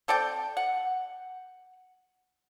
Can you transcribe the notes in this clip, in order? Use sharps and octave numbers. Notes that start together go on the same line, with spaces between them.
C4 A4 D5 G5
F#5